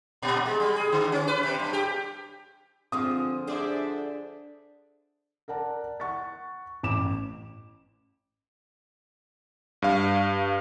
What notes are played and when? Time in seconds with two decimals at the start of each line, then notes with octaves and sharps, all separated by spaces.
0.22 A#2
0.46 G#3
0.60 G3
0.76 G#4
0.92 D3
1.12 C#4
1.27 B4
1.43 C3
1.59 G2
1.73 G4
2.92 D3 F3 C4 G#4 D#6
3.47 D3 D4 G#4 C5 D5 E5
5.48 A#4 D5 F#5 A5
6.00 F#5 C#6 A6
6.83 A1 D6 E7
9.82 G2 F5